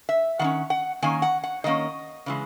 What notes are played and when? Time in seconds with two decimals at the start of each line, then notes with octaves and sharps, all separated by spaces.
0.09 E5
0.39 D#3 A#3 F#5
0.44 C#4
0.70 F#5
1.02 D#3 A#3 C#4 G#5
1.22 F#5
1.44 F#5
1.64 D#3 A#3 C#4 D#5
2.26 C#3 E3 G#3